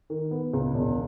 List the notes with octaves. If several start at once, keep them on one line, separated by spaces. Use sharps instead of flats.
D#3
B3
C#2
E1